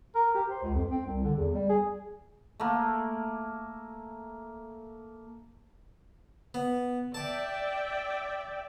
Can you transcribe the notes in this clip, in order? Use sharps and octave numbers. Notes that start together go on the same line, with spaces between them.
A#4
G4
C5
C#2
F2
C4
C2
D3
E2
G3
G#4
A3 A#3
B3
D5 E5 G5 A5 D6